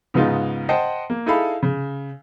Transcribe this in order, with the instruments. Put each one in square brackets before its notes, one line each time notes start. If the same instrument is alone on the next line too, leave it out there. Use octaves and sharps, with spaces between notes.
[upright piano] G#2 C#3 B3 D#4 F4
C5 D#5 F#5 G5 A5
A#3
D#4 E4 G#4 A4 F5 B5
C#3